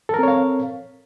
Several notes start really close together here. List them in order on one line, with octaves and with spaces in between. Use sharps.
A4 A#4 C4 C#5 F5